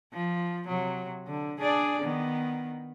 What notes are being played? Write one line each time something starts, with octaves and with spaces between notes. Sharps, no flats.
F3
C3 F#3
D3
D4 G#4 D5
D#3 B3